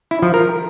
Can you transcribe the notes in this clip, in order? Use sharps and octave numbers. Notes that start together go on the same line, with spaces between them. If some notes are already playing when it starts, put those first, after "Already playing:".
E4
F3
A#4